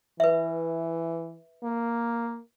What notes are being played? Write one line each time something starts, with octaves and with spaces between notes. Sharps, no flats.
E3 B4 E5
A#3